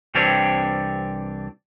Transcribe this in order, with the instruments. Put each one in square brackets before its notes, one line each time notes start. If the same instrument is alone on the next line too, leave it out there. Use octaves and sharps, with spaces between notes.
[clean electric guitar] C2 E3 C4 D4 G4 C#5